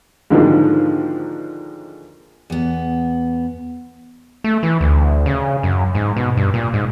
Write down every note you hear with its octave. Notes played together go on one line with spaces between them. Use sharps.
G#2 D3 D#3 F3 F#3 A#3
E2 B3
A3
E3
D2
C#3
F#2
G#2
B2
G2
A#2
G#2